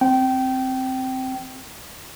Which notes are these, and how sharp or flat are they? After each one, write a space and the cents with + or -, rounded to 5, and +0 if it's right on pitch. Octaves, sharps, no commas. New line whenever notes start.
C4 +0 G5 -20